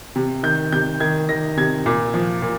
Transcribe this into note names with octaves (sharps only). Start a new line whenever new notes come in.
C3
D#3 G6
C3 G6
D#3 G#6
D#3 A#6
C3 G#6
A#2
F3
A#2